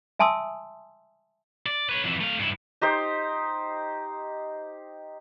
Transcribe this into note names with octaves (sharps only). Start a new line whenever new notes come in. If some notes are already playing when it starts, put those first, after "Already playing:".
E5 G#5 A5 C6 D#6 E6
D5
B4 C#5
F2 E3
A3 F5
G2 E4
D#4 G4 C5